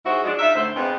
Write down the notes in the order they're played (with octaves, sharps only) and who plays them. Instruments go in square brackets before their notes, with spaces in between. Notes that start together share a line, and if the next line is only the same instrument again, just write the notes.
[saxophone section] G#2 E4 F#4 G#4 C5
F3 F#3 G#3 D4 F#4
D#4 F4 E5
D2 A2 C5
F2 G#2 F3 B3